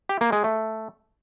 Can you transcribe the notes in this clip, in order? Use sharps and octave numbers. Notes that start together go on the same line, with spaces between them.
G4
A#3
G#3
A3